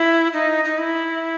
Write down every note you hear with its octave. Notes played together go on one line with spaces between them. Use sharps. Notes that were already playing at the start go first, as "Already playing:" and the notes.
Already playing: E4
D#4
D#4
E4